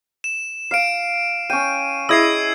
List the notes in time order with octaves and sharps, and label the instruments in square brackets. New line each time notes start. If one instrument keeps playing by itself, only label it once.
[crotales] E7
[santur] F5 [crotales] C7 D7
[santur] C#4 G5 [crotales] D#7
[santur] E4 G#4 D#5 [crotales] E6 G#6 C7